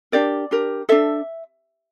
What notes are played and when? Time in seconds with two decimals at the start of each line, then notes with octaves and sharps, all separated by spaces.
0.12 D4 G4 A#4 D5
0.51 D4 G4 A#4
0.89 D4 A4 E5